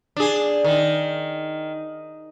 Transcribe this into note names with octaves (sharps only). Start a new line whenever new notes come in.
D4 G#4
D#3